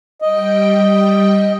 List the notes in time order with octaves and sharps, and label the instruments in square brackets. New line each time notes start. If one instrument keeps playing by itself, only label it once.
[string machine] G3 G5 [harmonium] D#5